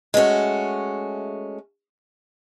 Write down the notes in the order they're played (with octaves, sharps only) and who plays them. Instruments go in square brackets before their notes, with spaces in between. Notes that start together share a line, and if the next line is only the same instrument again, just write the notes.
[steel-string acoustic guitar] G#3 A3 C#4 F#4